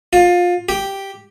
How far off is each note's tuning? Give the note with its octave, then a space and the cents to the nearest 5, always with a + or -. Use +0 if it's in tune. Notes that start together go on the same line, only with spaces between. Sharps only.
F4 +20
G4 +0